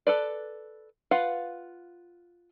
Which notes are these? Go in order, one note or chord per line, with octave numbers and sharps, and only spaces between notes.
A4 B4 D5
F4 B4 F5 F#5